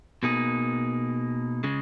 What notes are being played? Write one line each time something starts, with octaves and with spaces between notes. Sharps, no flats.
B2 A#3 D#4 G#4
C#3 G#3